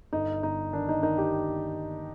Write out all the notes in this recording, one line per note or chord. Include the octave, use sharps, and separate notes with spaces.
G1 D#4
G1 D#4
D#3 D4
D#4
D#3 D#4
G4